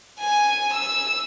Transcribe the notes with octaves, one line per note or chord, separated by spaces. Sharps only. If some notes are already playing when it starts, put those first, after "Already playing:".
G#5
E6